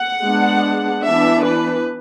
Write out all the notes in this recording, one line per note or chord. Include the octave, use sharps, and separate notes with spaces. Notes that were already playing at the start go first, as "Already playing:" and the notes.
Already playing: F#5
G#3 B3 D4
E3 B3 D4 E5
B4